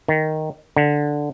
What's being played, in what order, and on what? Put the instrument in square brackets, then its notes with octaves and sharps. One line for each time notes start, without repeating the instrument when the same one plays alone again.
[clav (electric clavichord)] D#3
D3